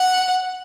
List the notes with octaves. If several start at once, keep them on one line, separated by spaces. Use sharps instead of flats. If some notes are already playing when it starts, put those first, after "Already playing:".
Already playing: F#5